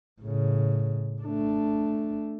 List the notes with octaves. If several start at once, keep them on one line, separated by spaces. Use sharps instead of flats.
A2 C#3
A3 D4